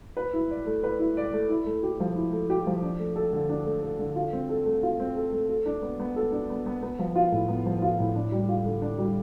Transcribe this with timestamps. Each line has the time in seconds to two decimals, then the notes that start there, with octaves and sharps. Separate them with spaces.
0.17 B4
0.33 E4
0.51 D5
0.66 A3
0.83 B4
0.99 E4
1.17 D5
1.33 A3
1.50 E4
1.66 A3
1.83 G4
2.00 F3
2.16 E4
2.33 A3
2.50 G4
2.67 F3
2.83 D4
2.99 A3
3.16 A4
3.33 D3
3.49 D4
3.66 A3
3.83 A4
3.99 D3
4.16 F4
4.33 C4
4.49 A4
4.65 A3
4.83 F4
5.00 C4
5.16 A4
5.32 A3
5.49 A4
5.66 D4
5.82 B3
6.00 B3
6.16 A4
6.32 D4
6.49 B3
6.66 B3
6.82 B3
6.99 F3
7.16 F4
7.32 A2
7.48 B3
7.66 F3
7.82 F4
7.99 A2
8.15 D4
8.32 G3
8.49 F4
8.65 D3
8.82 D4
8.98 G3